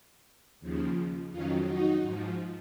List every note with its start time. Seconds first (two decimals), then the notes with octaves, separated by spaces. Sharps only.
0.60 D#2 C#3 F3
1.31 F2 D#3 F#3 C#4 F4
1.66 D#4 F#4
2.01 G#2 F3